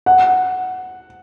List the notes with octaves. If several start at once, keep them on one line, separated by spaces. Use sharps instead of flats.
F#5